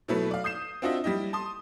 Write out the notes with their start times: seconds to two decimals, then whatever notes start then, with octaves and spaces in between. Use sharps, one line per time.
0.08 B2 F#3 A3 E4 A4 B4
0.31 D5 F5
0.44 D#6 G6 C7 E7
0.82 C4 D4 F4 F#4 D#5 E5
1.04 G3 E4 G4 D#5
1.33 A5 C6 D#6